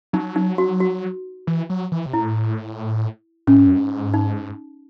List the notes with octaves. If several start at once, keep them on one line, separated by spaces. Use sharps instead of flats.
F#3 D#4
D#4
F#4
F#4
E3
F#3
E3
C3
A2 E4
A2 C#4
G#2
F#2
G#2
D#4